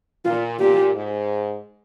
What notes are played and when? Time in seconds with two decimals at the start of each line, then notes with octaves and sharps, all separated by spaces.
0.25 A#2 F4
0.59 A#2 G4
0.94 G#2